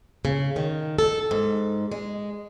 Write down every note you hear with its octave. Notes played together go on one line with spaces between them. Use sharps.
C#3
D#3
A4
G#2
G#3